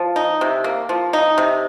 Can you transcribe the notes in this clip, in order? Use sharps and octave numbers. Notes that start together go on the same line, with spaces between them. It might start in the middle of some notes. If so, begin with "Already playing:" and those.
Already playing: F3
D#4
C3
A#3
F3
D#4
C3